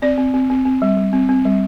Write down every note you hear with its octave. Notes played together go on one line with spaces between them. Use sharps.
C4 D5
C4
C4
C4
C4
G3
G3
C4
C4
G3